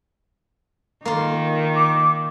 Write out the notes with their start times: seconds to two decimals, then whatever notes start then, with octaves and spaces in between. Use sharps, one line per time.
1.05 D#3 A#3 F4
1.75 D6